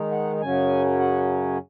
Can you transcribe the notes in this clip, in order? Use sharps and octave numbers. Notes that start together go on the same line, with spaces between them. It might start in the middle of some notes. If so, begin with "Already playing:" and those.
Already playing: D#3 G#3 D#4
F#5
F#2 C#3 F#3 C#4 G#5
F#5